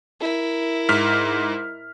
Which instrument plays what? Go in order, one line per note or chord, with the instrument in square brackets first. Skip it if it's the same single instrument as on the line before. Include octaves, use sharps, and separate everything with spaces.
[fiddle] E4 A#4
[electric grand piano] G#2 F6 B6